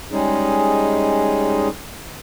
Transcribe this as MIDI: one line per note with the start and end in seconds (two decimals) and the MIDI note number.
0.11 1.68 55
0.11 1.68 56
0.11 1.68 61
0.11 1.68 63
0.11 1.68 68